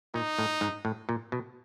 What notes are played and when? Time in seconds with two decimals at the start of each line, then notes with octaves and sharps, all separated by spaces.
0.14 A#2 D#4
0.39 A2
0.61 G#2
0.85 A2
1.09 A#2
1.32 B2